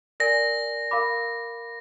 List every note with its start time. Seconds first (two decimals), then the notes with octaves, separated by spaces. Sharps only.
0.20 A#4 D5 G#5 A#6
0.91 A#4 F5 B5 D6